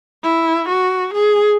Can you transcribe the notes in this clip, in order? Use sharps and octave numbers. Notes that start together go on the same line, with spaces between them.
E4
F#4
G#4